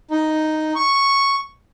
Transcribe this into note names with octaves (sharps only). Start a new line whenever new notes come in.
D#4
C#6